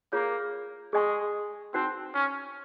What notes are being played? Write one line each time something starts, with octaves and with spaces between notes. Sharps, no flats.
A#3 F4 G#4 C#5
G#3 G#4 D#5 G#5 C#6
C4 D#4 F#4 C5 F#5
C#4